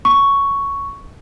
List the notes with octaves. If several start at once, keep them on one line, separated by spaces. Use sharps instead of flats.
C#6